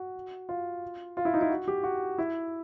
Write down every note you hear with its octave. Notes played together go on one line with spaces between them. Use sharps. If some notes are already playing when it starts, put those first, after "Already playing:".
Already playing: F#4
F4
F4
E4
D#4
E4
F#4
G4
F#4
E4